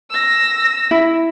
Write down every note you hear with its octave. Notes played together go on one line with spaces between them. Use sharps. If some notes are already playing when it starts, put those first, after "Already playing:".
E6 A#6
E4